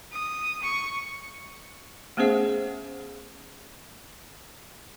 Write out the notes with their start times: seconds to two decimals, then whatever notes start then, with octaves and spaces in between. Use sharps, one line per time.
0.12 D#6
0.62 C#6
2.17 A3 B3 C#4 G#4 C5 E5